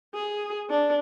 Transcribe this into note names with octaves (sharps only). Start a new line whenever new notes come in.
G#4
D4